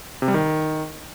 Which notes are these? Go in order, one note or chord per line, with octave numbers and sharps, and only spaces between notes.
C3
G3
D#3